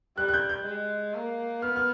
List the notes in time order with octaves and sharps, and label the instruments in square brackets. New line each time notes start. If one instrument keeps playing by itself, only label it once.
[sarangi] G3 [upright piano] F#6
[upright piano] F#6
G6
G6
[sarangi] G#3
A#3
[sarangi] B3 [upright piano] F6
[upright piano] F6